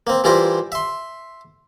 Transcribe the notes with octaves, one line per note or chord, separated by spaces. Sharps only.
A#3 C4
E3 G3 E4 F4 A#4 C5
E5 C6